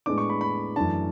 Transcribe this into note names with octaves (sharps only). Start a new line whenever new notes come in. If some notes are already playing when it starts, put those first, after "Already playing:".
A2 G#3 B3 D4 D6
C#6
B5
B5
F#2 E3 A3 D4 A5